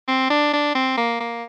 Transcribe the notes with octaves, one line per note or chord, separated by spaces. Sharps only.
C4
D4
D4
C4
A#3
A#3